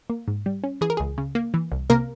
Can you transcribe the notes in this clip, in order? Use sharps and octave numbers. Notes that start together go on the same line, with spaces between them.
A#3
G#2
G3
C#4
E3 G#4
A#4
C#2 G#4
C#3
A#3
E3
C2
C3 A#3 A#4